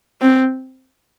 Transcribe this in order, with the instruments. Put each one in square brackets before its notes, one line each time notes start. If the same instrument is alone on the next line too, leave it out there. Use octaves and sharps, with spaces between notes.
[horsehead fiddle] C4